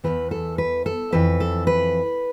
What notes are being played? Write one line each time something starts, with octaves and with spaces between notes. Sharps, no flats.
E2 C3 E3 B4
A4
B4
A4
F2 E3 B4
A4
B4